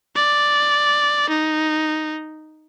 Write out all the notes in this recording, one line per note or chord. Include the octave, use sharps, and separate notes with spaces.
D5
D#4